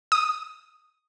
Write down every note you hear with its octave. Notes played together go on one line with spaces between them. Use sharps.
D#6